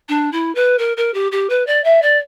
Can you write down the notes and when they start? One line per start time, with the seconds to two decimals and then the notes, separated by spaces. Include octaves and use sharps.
0.09 D4
0.32 E4
0.55 B4
0.78 A#4
0.97 A#4
1.14 G4
1.31 G4
1.49 B4
1.67 D5
1.84 E5
2.02 D5